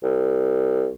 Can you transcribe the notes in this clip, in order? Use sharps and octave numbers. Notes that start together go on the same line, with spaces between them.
C2